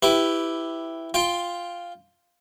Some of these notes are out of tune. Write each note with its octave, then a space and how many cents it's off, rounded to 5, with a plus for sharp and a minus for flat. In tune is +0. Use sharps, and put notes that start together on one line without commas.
E4 +0 G4 +0 B4 +15
F4 +0 G5 +15